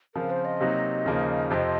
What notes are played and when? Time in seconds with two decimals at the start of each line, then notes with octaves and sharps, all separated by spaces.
0.15 C#3 F3 C4 F4 A#4
0.30 C5
0.45 D#5
0.60 C3 F#3 A#3 D#4 F#4
1.05 D#2 C#3 F3 A#3 D#4
1.50 F2 C3 F3 C4 D#5 F5